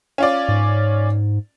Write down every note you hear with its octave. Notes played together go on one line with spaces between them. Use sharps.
C#4 F4 D5
G#2